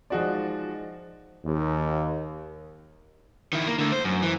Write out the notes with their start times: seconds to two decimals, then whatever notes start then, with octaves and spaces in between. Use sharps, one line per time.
0.10 F3 G#3 D#4 F#4 G#4 D5
1.45 D#2
3.53 D#3 E4
3.67 A#3
3.78 D3 A3
3.92 C5
4.04 F#2
4.22 E3